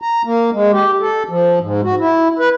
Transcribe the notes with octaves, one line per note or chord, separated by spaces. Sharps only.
A#5
A#3
G#3
G4
A4
F3
G#2
F#4
E4
B4